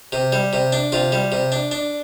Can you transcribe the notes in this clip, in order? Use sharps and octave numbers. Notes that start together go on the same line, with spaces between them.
C3
G3
C3
D4
C3 F4
G3
C3
D4
D4